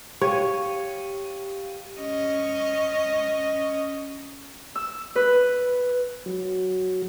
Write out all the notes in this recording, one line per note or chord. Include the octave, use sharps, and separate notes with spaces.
G4 C#5 F5 D#7
C#4 D#5
E6
B4
F#3